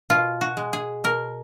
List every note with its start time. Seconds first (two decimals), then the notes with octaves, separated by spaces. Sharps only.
0.10 B2 F4
0.41 F#4
0.57 G#3
0.73 G#4
1.04 B2 A#4